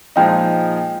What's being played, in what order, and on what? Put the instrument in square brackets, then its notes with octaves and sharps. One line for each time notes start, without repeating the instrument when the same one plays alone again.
[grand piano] A#2 F3 G#3 D#4 [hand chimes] G5